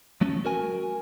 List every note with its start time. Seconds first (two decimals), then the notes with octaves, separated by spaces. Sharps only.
0.21 F#3 A3 C#4
0.45 F#4 A#4 G#5